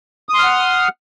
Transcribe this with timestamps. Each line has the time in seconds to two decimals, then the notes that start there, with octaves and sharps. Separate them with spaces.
0.29 D#6
0.34 C6
0.39 F6
0.44 F#5